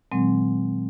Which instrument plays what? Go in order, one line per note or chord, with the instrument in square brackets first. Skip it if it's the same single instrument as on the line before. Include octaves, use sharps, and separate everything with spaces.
[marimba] A#2 D#3 F#3 G#3 C4